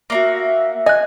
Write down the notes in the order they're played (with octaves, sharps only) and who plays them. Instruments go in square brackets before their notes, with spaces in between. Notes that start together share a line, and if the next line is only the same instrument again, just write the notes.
[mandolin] A#3 D4 F#4 [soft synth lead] E5
[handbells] D#5 F#6 [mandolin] G#5